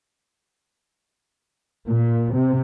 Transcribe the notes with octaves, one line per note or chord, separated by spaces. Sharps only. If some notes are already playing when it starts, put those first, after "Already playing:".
A#2
C3